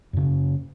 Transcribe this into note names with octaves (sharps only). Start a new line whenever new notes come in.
F#2 C#3